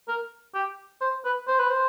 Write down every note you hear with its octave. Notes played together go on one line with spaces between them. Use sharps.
A#4
G4
C5
B4
C5
B4
C5